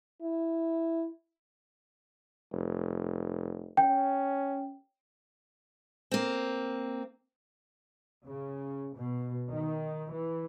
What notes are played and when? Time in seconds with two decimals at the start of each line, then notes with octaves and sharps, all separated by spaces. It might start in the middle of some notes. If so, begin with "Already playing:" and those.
0.22 E4
2.52 F1
3.77 C#4 G5
6.11 A#3 C4
8.26 C#3
8.95 B2
9.51 D#3
10.11 E3